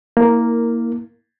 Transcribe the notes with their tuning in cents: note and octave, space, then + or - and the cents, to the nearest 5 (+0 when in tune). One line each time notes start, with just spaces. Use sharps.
A#3 +0 E4 -25 A#4 -10